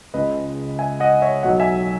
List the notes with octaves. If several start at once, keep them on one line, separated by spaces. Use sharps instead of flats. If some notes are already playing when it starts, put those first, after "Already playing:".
C#2 C#3 G#3 B4 D#5
E5 G#5
D#5 F#5
C#5 E5
B1 B2 F#3 D#5 F#5
E5 G#5